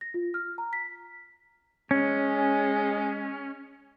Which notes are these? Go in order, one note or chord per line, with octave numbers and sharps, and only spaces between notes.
A#6
F4
F6
A#5
B6
G#3 C#4